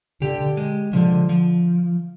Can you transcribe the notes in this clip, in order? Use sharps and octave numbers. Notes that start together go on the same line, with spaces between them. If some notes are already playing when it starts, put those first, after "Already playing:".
D3 G4
G#3
D3 F3
F3